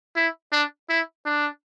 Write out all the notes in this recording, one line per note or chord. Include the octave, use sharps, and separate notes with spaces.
E4
D4
E4
D4